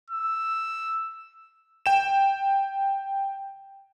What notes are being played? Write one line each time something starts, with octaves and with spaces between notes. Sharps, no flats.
E6
G5 E7